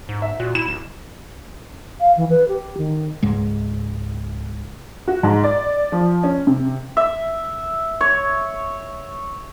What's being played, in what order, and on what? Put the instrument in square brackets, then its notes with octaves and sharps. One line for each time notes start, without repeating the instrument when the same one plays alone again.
[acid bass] G#2
[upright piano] E5
[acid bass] A#2 [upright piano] F#4
[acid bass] E4 [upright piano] E7
[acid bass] D1
[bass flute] F5
E3
B4
G4
D#3
[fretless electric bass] C#2 G#2 G#3
[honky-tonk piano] F#4
G#2
D5
F3
C#4
C3
[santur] E5
C#5